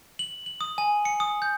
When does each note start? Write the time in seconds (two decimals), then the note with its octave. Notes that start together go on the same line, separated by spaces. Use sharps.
0.19 F#7
0.46 F#7
0.61 D#6
0.78 G#5
1.05 C#7
1.20 D#6
1.42 G6